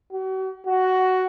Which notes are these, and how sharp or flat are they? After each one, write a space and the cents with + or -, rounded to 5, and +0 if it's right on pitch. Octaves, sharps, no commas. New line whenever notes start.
F#4 +40
F#4 +10